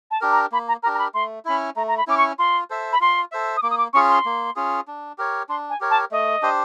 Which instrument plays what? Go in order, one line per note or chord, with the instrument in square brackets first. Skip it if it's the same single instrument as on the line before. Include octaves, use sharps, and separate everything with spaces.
[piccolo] A5
[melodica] D4 G4 A#4
[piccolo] A#5
[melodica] A#3 [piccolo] B5
[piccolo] A#5
[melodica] D4 G4 A#4 [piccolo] A#5
[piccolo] A#5
B5
[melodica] A3 [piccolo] C6
[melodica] C#4 E4 [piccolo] B5
[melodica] A3 [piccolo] A#5
[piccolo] A#5
B5
[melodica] C#4 E4 [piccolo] D6
[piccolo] C#6
[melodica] F4 [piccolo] C6
[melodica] A4 C5 E5
[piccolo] B5
[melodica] F4 [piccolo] C6
[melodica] A4 C5 E5
[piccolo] D#6
[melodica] A#3 [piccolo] D6
[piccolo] D#6
D6
[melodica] C#4 F4 G#4 [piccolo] C#6
[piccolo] C6
[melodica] A#3
C#4 F4 G#4
D4
G4 A#4 C#5
[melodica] D4 [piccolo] C6
[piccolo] G#5
[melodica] G4 A#4 C#5
[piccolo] A5
[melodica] A3 [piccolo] D#5
[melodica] D4 G4 C5